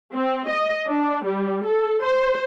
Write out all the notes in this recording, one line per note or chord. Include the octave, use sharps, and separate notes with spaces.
C4
D#5
D4
G3
A4
C5